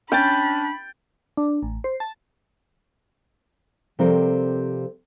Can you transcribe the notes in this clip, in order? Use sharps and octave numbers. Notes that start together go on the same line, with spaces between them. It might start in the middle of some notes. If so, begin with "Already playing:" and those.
C#4 D4 G5 B5 A6
D4
A1
C5
A5
C3 F3 G3 C4 A4 A#4